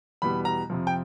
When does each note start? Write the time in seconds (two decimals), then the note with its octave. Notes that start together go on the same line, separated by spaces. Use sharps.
0.22 E2 B2 G3 B3 B5
0.45 A#5
0.70 F2 C3 F3
0.87 G5